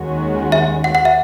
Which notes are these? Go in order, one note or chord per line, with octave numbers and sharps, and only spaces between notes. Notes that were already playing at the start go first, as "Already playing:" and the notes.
Already playing: D#2 D#3 G#3 C#4 F#4
E5
F#5
F#5
E5